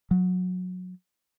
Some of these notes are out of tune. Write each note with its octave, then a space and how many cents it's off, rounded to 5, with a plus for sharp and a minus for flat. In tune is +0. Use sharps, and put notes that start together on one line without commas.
F#3 -20